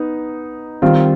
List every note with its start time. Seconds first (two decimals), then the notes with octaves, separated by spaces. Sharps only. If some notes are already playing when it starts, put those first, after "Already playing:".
Already playing: B3 D#4
0.82 D#3 G3 C4 F4